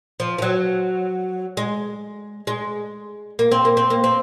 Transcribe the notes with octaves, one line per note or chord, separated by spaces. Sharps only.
F3
F3
F#3
G#3
G#3
A#3
C4
A#3
C4
A#3
C4